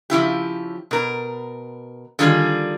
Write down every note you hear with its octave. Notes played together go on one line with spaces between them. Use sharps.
C#3 F3 E4 G4
B2 A#4
D3 D#3 G3 F4 G#4